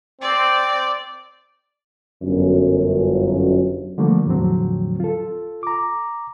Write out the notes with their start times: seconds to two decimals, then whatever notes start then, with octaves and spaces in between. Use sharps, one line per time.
0.21 C4 D5
2.22 G1 F#2
3.98 D3 F3 G3 A3 A#3
4.26 E2 A2 D3 F3 F#3 C4
5.00 F4 A4
5.63 A#5 D6